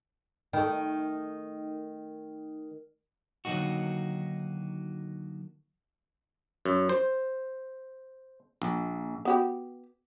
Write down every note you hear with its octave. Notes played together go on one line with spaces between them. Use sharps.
D#3 A3
D3 D#3 F#3 A#3 D#4 F#4
F#2
C5
A#1
B3 F#4 G4